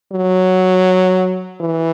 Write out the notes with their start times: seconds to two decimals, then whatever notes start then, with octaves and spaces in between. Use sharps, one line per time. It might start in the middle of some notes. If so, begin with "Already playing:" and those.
0.12 F#3
1.60 E3